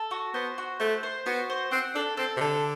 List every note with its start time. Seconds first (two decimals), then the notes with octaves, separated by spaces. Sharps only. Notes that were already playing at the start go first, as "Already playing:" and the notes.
Already playing: A4
0.11 F#4
0.34 B3 C5
0.58 F#4
0.80 A3 C5
1.03 C5
1.26 B3 F#4
1.50 C5
1.72 C4 F#5
1.95 D4 A4
2.17 C4 A4
2.37 C3
2.41 D3 A4